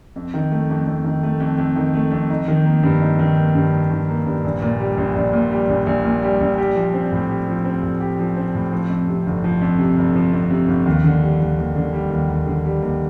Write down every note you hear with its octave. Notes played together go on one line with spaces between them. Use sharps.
F2
D#3
A3
F2
F2
D#3
A3
F2
F2
D#3
A3
F2
D#4
D#3
A#3
G2
D#4
D#3
A#3
G2
D#4
D#3
A#3
G2
A#1
A#2
G3
A#1
A#1
A#2
G3
A#1
A#1
A#2
G3
A#1
G4
F3
C4
A2
G4
F3
C4
A2
G4
F3
C4
A2
F3
F2
C3
G1
F3
F2
C3
G1
F3
F2
C3
G1
D#2
D3
G3
D#2
D#2
D3
G3
D#2
D#2
D3
G3
D#2